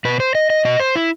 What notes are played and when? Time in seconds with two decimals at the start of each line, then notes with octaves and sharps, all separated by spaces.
0.05 B2 B4
0.20 C5
0.35 D#5
0.50 D#5
0.65 B2 D#5
0.80 C5
0.96 E4